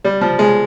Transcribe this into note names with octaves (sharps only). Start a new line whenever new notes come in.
G3
F3
G#3